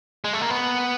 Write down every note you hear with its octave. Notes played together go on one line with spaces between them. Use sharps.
G#3
A3
A#3
B3